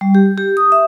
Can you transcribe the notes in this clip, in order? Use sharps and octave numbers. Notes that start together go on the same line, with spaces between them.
G3
G4
G4
D#6
E5